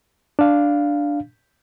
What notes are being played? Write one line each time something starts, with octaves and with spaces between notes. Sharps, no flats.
D4 F5